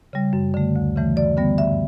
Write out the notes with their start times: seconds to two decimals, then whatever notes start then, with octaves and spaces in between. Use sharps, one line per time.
0.13 C#3 G3
0.33 F#2
0.54 D3 A3
0.76 D2
0.96 C#3 E3 A3
1.16 F#2 D5
1.37 D3 G3 B3
1.58 G2 E5